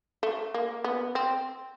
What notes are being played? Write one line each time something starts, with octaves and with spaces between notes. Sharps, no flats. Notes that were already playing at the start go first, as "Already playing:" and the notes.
A3
A#3
B3
C4